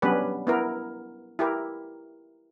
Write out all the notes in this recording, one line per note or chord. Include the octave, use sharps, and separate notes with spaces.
F#3 G3 B3 C#4 D4 B4
B3 E4 A#4
E4 G4 A#4